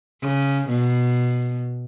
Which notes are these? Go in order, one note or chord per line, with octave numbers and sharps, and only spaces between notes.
C#3
B2